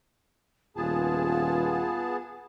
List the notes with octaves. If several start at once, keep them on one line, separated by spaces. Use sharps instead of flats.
D#1 B3 F4 G#4 A5